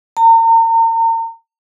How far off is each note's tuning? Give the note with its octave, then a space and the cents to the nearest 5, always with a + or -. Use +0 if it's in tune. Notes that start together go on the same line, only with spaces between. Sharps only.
A#5 -40